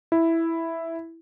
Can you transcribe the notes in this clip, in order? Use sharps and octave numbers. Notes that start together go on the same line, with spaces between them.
E4